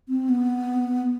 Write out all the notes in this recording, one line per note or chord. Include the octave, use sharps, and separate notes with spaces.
C4
B3